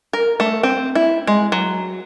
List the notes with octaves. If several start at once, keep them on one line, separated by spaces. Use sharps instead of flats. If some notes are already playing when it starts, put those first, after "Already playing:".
A#4
A3
C4
E4
G#3
F#3